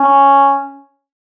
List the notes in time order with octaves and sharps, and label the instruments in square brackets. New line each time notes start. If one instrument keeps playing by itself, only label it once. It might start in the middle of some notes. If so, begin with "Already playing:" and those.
Already playing: [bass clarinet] C#4